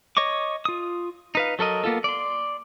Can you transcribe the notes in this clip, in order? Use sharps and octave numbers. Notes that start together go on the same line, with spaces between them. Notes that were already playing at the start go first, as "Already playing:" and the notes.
C#5 D#5 C#6 D6
F4 D#6
D#4 B4 F5
F#3 A4 A#4 D#5
A#3 B3 F4 A4
D5 C6